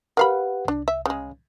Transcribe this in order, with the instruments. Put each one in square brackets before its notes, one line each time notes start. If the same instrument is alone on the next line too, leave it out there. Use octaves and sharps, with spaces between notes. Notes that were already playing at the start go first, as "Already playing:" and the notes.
[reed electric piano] G4 B4 F#5 [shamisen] A#4 F5 B5
[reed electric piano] C2 [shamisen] D4
[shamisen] E5
C#3 G#3